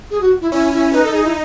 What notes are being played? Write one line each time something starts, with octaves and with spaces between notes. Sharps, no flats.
G#4
F#4
E4
C#4 E4
E4
D#4 B4
A4
G#4
E4